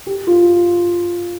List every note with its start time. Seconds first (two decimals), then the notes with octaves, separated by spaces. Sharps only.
0.07 G4
0.27 F4